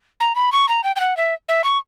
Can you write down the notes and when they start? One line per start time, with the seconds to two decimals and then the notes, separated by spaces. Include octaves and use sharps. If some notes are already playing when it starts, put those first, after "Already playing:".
0.20 A#5
0.35 B5
0.52 C#6
0.68 A#5
0.84 G5
0.96 G5
1.00 F#5
1.17 E5
1.48 E5
1.64 C#6